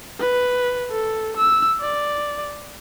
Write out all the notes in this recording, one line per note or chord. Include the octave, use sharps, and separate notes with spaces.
B4
A4
E6
D5